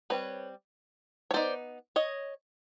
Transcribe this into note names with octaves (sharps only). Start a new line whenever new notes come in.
G3 C4 D#4 B4 C#5
C#5
G3 B3 D#4 C5 D5
C#5 D#5